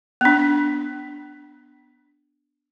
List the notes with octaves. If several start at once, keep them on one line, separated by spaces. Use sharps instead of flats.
B3 D4